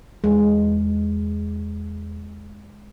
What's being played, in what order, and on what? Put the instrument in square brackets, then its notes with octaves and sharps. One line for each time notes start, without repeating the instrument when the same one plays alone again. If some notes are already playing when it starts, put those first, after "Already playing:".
[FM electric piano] E2 [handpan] G#3